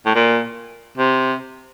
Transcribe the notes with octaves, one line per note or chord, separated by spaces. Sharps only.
A2
A#2
C3